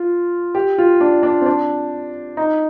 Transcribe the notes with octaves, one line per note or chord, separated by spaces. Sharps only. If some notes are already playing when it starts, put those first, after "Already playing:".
Already playing: F4
G4
F4
D4
D4
C4
D4
D#4